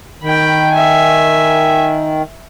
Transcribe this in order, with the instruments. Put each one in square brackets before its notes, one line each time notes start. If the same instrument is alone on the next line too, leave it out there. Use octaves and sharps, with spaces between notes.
[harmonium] D#3 [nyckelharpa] G5 B5
[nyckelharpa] E5 G#5